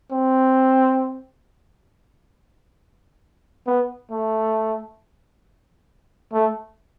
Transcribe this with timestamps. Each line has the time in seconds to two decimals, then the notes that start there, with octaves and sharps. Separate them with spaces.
0.12 C4
3.67 B3
4.11 A3
6.33 A3